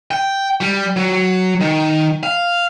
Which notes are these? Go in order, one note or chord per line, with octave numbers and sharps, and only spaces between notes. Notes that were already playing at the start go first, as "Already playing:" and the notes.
G5
G3
F#3
D#3
F5